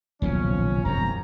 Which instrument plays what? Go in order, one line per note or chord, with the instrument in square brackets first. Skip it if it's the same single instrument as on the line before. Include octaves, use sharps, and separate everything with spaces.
[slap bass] D#1 B1 C#3 [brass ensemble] F3 C#4
[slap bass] E1 F#2 [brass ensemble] C2 A#5